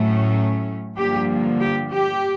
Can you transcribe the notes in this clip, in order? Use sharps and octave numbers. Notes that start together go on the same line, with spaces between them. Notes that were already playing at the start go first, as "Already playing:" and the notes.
Already playing: A2 F#3 A3 C#4
G2 D3 F3 A#3 G4
G4
G4